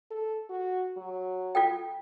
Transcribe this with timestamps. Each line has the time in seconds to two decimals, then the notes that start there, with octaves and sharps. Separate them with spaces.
0.11 A4
0.50 F#4
0.97 F#3
1.55 F4 A4 G5